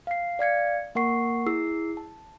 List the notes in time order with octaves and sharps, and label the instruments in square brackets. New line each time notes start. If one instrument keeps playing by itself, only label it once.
[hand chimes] F5 C7
D5 F5 G#6 C#7
A#3 A#4 F#5 C#6 C7
E4 G#4 E6 C7
A5